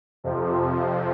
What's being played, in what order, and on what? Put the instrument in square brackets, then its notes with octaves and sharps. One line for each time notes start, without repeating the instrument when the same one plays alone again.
[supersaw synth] F2 C3 F3